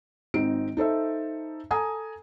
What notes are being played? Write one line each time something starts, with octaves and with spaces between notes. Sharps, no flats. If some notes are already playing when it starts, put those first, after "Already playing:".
G#1 C4 D#4 D7
D#4 A4 C5 E5
A4 G#5 A#5 D#6